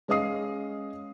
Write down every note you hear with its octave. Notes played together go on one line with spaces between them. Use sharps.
G#3 C#4 D#5 F5 D#6 C7